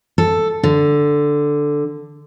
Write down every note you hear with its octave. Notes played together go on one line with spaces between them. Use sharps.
A4
D3